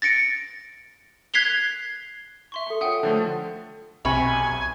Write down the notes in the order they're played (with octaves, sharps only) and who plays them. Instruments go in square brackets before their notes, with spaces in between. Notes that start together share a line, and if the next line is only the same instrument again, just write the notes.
[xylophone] A6 A#6 C#7 D7
F#6 G#6 B6 C7 F7 G7
E5 C6 C#6
[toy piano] A4 G5
[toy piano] D4 F4 C#5 [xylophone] E5 F#5 G5 [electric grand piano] D#6
[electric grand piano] D3 F3 A3 [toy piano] D#4 A4
[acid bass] B1 [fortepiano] C3 [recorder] G#5 [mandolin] B5 C#6